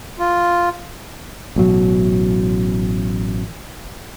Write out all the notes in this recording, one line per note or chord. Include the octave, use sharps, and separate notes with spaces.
F4
A1 B2 F#3